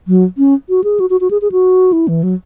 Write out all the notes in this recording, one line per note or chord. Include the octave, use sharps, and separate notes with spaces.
F#3
C#4
F#4
G#4
F#4
F#4
F#4
G#4
G#4
F#4
E4
E3
F#3